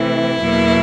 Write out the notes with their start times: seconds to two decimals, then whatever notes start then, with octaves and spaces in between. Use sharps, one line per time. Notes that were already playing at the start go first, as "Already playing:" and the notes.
Already playing: C3 E3 A3 E4
0.40 E2 B2 F#3 A#3